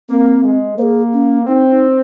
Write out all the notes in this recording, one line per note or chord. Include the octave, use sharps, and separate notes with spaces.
A#3 C4
G#3
A#3 G#4 C5
C#4
C4 D#4
D#4